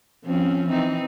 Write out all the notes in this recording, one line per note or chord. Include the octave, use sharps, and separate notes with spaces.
F3 C4 C#4
E3 C4 D#4